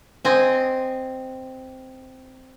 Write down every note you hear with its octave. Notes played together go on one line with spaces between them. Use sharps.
C4 D#5 G#5